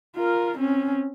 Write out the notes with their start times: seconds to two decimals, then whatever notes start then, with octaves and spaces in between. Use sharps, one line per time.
0.16 F4 A#4
0.58 C4 C#4